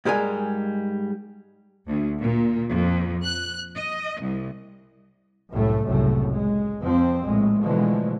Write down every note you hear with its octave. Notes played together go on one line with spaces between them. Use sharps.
G#2 G3 G#3 A#4 G#5
D2
A#2
F2
F#6
D#5
C2
C2 F#2 A2 A3
F#1 C2 F#2 A2 C3 A3
G#3
F2 F3 C4
A#1 A2 G#3
B2 D3 E3 F3 G#3 A3